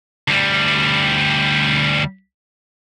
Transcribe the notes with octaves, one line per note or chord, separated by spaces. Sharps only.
D2 G3